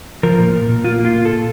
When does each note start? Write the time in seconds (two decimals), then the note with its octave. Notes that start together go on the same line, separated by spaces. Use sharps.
0.23 F3 A#4
0.39 A#2
0.53 A#2
0.69 A#2
0.84 A#3 F4
0.99 A#3
1.05 F4
1.15 A#2
1.25 A#2 A4